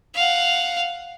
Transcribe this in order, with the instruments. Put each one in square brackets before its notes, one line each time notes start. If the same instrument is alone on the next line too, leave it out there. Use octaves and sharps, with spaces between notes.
[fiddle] F5 F#5